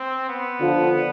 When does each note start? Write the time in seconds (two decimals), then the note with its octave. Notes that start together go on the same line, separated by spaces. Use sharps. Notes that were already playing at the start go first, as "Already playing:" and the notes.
Already playing: C4
0.29 B3
0.60 D3 F3